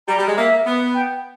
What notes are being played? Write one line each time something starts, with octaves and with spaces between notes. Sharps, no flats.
G3 A#5
G3
G#3
A#3 E5
B3
G5